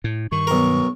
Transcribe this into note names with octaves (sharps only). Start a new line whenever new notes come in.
A2
G2 D#3 C#6
B1 A#4